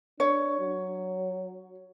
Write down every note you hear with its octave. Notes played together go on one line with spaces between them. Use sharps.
D4 C#5
F#3